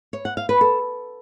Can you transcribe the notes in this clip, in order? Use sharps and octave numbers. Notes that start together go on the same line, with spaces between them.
C#5
F#5
F5
B4
A4